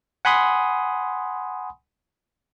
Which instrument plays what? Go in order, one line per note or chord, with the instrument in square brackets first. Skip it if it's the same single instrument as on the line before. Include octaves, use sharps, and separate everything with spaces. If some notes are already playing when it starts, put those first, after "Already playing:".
[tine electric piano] F#5 G#5 B5 C6 D#6